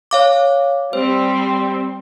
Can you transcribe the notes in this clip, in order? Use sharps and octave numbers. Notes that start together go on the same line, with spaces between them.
C#5 F5 D6
G3 C4 C5